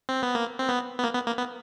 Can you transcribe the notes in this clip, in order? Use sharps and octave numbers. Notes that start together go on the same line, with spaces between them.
C4
B3
A#3
C4
B3
B3
A#3
B3
A#3
B3